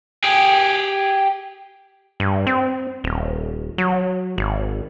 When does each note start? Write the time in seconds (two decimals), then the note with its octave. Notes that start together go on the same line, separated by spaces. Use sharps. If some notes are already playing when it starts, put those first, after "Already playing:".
0.24 G4 G#4
2.20 G2
2.47 C4
3.04 D#1
3.78 F#3
4.38 G#1